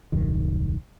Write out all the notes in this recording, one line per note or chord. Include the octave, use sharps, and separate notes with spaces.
D#1 C2 F#2 D#3